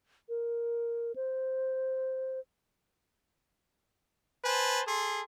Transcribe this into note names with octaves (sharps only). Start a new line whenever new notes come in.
A#4
C5
B4 C5 G#5 A5
G#4 A4 C6